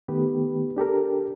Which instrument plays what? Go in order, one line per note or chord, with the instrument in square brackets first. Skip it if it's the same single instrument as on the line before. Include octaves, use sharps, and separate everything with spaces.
[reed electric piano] D#3 A3 B3 G4 B4
D4 G4 A4 A#4